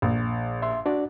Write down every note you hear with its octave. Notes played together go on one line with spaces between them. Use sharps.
A#1
E5 C6
D4 F#4 D5